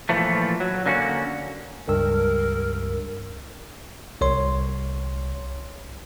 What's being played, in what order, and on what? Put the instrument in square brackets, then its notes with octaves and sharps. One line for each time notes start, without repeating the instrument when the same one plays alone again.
[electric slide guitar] A#2 E3 F3 A3
F#3
D3 A#3 C#4 F#4
[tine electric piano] C#2 G2 E6 [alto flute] A#4
[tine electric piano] C2 C#5 C6